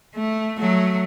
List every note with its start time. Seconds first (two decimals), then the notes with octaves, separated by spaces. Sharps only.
0.16 A3
0.58 F#3 A3